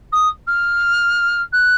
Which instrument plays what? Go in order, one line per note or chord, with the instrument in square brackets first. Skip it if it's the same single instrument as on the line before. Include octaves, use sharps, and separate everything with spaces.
[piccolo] D#6
F6
F#6